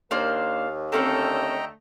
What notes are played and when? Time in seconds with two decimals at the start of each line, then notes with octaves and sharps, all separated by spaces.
0.11 D#2 A#3 D4 A#4 C5 F5
0.92 D3 A3 C4 C#4 A4 D#5 G5 A#5